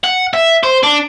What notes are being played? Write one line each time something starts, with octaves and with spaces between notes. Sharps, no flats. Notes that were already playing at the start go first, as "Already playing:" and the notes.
F#5
E5
C5
D4